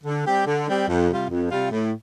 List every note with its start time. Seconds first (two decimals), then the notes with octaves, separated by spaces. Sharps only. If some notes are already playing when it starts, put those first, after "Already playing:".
0.04 D3
0.25 G3 C4 G4
0.46 D3
0.67 G3 C4 G4
0.87 F2
1.09 C3 G3 F4
1.29 F2
1.50 C3 G3 F4
1.70 A2